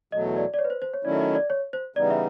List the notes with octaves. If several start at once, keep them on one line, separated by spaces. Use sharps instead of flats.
E2 B2 F#3 A3 D#5
D5
D5
C#5
B4
C5
C5
C#5
D#3 F#3 A3 C#4 E4 D5
E5
D#5
D5
C#5
C5
C#3 E3 G3 B3 D#4 D5
E5